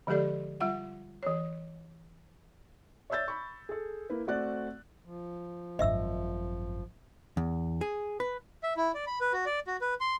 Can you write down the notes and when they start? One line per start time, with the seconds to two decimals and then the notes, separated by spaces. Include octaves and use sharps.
0.07 D3 F3 G#3 G4 A4 D5
0.60 G3 F4 E5 F#5
1.23 E3 C#5
3.10 C#5 D5 E5 E6 G6 A6
3.28 B5 C#6
3.69 G#4 A4
4.10 A#3 E4 B4
4.27 A3 C4 F#4 D5 F#6 A6
5.05 F3
5.79 G#1 F#2 D#5 E5 E6
7.37 E2
7.81 G#4
8.20 B4
8.63 E5
8.77 E4
8.94 D5
9.07 B5
9.21 B4
9.33 F#4
9.46 D5
9.67 F#4
9.81 B4
10.00 C6